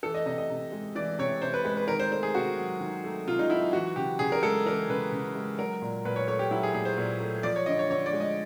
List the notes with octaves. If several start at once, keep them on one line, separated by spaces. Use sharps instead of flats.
E3 A4
D#5
C3 D#5
D#5
C3
G#3
E3 D5
C3 C#5
C3 C5
B4
G#3 B4
B4
D#3 A#4
C5
A3 C5
G#4
C3 F#4
F#3
D#3
A3
C3 F4
D#4
F#3 E4
E3 F#4
C#3 G4
C#3 G#4
A#4
G#3 A4
E3 A#4
C#3 B4
C#3
G#3
F#3 A#4
A#2
A#2 B4
C#5
A3 C#5
G4
F#3 E4
G#4
A#2 G#4
C5
A#2
A3
F3 D5
C#5
D3 D#5
C#5
D3 C#5
D5
G#3
D#5